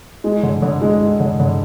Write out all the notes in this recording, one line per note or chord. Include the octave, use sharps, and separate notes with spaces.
G#3
D3
D3
G#3
G#3
D3
D3